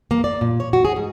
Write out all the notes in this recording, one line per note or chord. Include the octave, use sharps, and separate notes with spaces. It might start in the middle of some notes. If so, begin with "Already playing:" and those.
A#3
D5
A#2
C#5
F#4
G#4
G#2